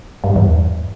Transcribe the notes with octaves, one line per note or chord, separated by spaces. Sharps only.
G2
G#2
E2